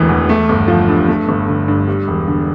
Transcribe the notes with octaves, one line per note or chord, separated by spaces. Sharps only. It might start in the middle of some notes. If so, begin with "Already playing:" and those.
Already playing: E1 D2 E3 A3
E2
A3
G1
F3
G2
A3
G1
D3
G2
G3
E1
D3